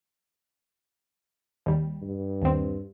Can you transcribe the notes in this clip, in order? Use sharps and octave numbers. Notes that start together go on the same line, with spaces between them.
D#2 G3
G2
D#2 C4